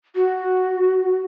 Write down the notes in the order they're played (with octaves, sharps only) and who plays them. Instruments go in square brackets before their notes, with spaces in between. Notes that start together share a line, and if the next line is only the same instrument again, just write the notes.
[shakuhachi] F#4